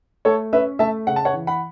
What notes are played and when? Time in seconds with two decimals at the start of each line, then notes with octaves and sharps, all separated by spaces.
0.25 A3 A4 C#5
0.52 C#4 B4 E5
0.79 A3 E5 A5
1.07 C#3 F#5
1.16 A5
1.25 C#5 F#5
1.33 E3
1.47 F#5 B5